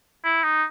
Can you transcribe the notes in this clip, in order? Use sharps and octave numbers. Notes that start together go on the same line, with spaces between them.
E4
D#4